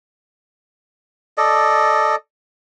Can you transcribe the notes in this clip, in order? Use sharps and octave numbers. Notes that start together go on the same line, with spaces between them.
A4 D5 D#5